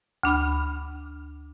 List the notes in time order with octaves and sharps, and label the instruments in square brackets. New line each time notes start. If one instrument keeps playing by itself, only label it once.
[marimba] D2 D4 B5 F6